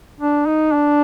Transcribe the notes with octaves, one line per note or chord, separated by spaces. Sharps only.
D4
D#4
D4